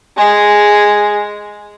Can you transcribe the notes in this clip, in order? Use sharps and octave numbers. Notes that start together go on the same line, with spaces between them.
G#3 G#4